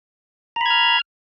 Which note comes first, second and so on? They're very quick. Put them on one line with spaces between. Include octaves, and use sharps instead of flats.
A#5 B5 G#6 F6